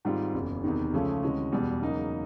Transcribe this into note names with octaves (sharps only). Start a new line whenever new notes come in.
G#2 D#3 G3 C4 F4
F#1 E2 C#3
E2 C3 D#3
C#2 C#3 F3 A3 C#4
D2 C3 E3 G#3 C#4
E1 E2 B2 G3
E2 C#3 F#3 A#3 D#4